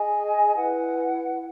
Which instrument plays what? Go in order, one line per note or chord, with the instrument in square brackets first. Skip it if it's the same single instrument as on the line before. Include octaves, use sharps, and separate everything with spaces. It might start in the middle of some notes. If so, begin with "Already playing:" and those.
Already playing: [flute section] G#4 D#5 G#5
E4 B4 F#5